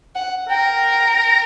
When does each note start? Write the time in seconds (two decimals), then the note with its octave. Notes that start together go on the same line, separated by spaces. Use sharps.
0.15 F#5
0.49 A#4 G5
0.83 G5